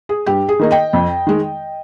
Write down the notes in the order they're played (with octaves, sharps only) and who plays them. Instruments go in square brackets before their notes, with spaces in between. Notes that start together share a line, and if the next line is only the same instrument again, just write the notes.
[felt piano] G#4
G2 G4
G#4
D#3 A#3 D#4
D#5 G5
F2
D#3 G#3